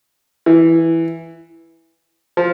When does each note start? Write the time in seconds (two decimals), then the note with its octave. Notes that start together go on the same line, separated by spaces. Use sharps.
0.46 E3
2.37 F3